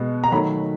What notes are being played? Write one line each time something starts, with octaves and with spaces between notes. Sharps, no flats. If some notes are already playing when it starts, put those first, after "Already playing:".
Already playing: B2 G#3 B3
A#5
D#3 F#3 A3 B5